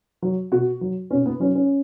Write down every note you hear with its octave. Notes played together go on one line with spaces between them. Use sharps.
F#3
B2 F#4
F#3
B2 C#4
B3
F#3 C#4
C#4